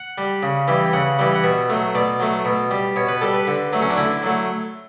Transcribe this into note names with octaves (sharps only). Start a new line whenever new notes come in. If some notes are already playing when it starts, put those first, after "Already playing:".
Already playing: F#5
G3
C#3
E3 G3
G5
C#3 F#5
E3 G3
G5
F#5
B2 E5
F#3 A3
B2 D5
F#3 A3
B2
G3
B2 C#5
B4
G3 A4
B4
D3
F#3 A3
C#4
D4
D3 E4
F#3 A3